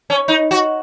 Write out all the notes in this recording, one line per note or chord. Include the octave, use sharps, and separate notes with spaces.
C#4
D#4
F#4